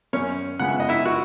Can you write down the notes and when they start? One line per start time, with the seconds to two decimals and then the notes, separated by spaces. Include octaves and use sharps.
0.13 F#2 C#4 C#5
0.59 C#3 G#3 B3 F#5
0.69 E5
0.80 D#5
0.89 E4 E5
1.05 F#4 F#5